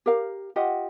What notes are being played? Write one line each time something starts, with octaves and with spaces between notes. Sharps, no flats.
G4 A#4 F5
F4 G4 D#5 F#5